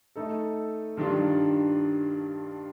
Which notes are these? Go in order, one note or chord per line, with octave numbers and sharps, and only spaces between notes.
A3 D#4 A4
G2 D#3 G3 D4 F4